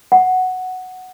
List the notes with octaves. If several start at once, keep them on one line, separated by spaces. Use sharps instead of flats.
F#5